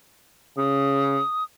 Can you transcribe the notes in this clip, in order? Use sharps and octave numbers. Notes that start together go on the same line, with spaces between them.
C#3 D#6